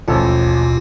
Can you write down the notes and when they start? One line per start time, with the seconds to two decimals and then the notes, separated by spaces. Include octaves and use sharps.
0.08 A1 D#2 B2 F3 F4 A4